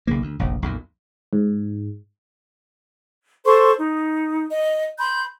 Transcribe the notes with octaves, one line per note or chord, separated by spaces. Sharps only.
B1 C#3 A#3
D2
F1 A#1
B1 F2 A#2
G#2
A4 C5 C6 C#6
D#4
D#5
B5 C6 G6